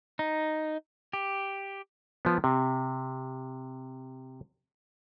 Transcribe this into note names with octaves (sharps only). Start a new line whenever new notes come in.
D#4
G4
F3 B3
C3